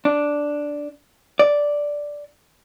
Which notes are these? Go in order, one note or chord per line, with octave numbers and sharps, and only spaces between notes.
D4
D5